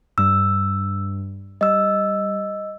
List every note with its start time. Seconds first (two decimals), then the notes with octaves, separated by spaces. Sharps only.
0.18 G2 G3 E6
1.61 G3 D#5 E6